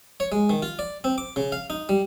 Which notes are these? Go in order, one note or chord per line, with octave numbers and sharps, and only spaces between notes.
C#5
G#3
D#3
F4
D5
C4
D6
C#3
F5
D#4
G3